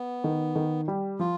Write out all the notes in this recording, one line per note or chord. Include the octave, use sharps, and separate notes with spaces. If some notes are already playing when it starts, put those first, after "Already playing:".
Already playing: B3
D#3
D#3
G3
F3 F4